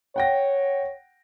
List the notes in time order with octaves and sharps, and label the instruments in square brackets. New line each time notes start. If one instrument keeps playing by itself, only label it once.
[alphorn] C#5 [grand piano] F#5 G5 A#6